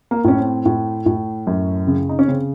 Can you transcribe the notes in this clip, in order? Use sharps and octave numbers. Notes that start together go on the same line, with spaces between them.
A#3
A2 C#4
C4
A2
A2
F#2
C#3
D#4
C#4
C#3 C4